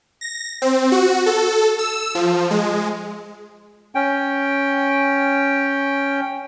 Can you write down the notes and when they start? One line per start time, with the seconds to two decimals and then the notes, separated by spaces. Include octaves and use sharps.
0.21 A#6
0.62 C4
0.92 F#4
1.26 A4
1.79 E6
2.15 F3
2.51 G#3
3.95 C#4 G5